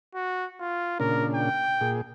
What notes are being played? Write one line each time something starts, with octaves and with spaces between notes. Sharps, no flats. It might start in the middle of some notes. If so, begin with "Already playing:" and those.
F#4
F4
A#2 C#3 D4 A#4
G5
A#2 G#4